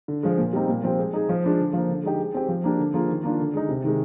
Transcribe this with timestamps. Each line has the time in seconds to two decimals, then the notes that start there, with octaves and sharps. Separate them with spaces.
0.08 D3
0.23 F3 G#3
0.38 A#2
0.53 G3 C4 D#4
0.69 A#2
0.84 F3 C4 G4
0.99 G#3
1.14 D#4 G#4
1.29 F3
1.44 G#3 D4 F4
1.59 D3
1.73 F3 A#3
1.89 D3
2.04 G#3 D#4 G4
2.19 G#3
2.34 C4 G4
2.49 F3
2.64 A#3 D4 G4
2.79 D3
2.94 F3 A#3 F4 G#4
3.09 D#3
3.23 A#3 D4 F4
3.40 D3
3.54 G#3 D#4
3.69 C3
3.84 D#3 G#3